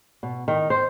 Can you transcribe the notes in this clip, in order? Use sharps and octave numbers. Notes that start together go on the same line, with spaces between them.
B2
D#3
C5